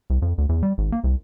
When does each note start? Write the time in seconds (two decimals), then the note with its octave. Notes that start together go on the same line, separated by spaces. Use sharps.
0.10 C2
0.22 F2
0.38 D2
0.49 E2
0.63 G3
0.78 G#1
0.92 A#3
1.04 C2